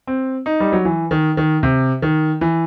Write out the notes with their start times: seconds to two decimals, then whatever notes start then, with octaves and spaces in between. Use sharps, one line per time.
0.07 C4
0.46 D#4
0.60 G3
0.72 F#3
0.85 E3
1.11 D#3
1.37 D#3
1.63 C3
2.02 D#3
2.41 E3